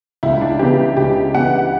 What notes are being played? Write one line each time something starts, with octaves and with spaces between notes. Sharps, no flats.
C#2 E4
D4
C#3 E3 G4
C#2 G4
C#3 E3 F#5